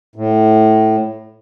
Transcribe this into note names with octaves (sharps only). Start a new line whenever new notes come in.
A2